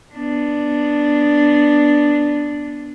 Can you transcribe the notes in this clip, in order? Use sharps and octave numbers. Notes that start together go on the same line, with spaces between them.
B3 D4